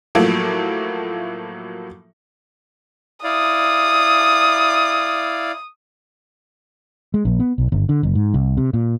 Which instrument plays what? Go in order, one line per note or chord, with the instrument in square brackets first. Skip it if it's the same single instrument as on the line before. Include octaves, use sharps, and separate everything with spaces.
[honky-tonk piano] A2 F3 F#3 A3 A#3
[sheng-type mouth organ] E4 D5 F5 [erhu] D#6
[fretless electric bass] G#3
A#1
B3
B1
G1
D3
F#1
G#2
C2
C3
A#2